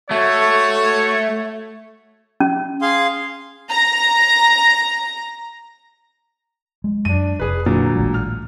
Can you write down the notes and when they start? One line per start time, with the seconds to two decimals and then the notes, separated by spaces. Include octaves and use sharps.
0.11 A3 F#4 C#5
2.40 C#4
2.82 G#4 F5 C6
3.71 A#5 A#6
6.84 G#3
7.05 F#2 D4 D#7
7.40 F1 G#4 B4
7.66 A#2 D3 F#3
7.96 A1 D2 G#3
8.14 F6